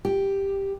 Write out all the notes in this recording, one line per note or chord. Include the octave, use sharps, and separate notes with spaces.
G4